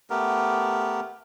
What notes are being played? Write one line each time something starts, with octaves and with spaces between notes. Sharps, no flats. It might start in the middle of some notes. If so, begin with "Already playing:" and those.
A3 B3 G4 A#4